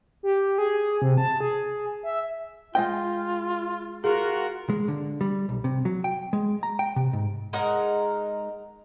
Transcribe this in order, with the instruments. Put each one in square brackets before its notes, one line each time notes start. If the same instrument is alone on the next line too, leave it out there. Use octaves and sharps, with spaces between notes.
[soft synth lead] G4
G#4
C3
A5
G#4
E5
[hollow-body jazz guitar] G#3 D#5 G5 [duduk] F4
[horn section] F4 F#4 A#4 [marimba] G#4
[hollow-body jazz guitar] G#3
D3
G3
B1
C3
F#3
G5
G#3
A#5
G5
C3
G#2
[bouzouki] G#3 D#4 A#4 F#5